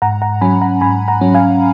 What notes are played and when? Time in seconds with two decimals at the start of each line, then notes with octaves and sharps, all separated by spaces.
0.02 G#2 F#5 A#5
0.22 F#5 A#5
0.41 F#3 C#4 G#5 B5
0.61 F#5 A#5
0.81 G#2 G#5 B5
1.08 F#5 A#5
1.21 F#3 C#4
1.34 F5 G#5